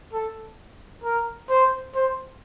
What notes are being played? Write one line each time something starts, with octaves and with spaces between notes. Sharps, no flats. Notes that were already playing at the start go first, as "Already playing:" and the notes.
A4
A#4
C5
C5